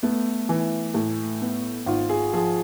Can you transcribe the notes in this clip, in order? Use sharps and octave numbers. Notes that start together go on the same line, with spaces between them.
A3 B3
E3
A2
B3
G#1 F4
G#4
F3 G#4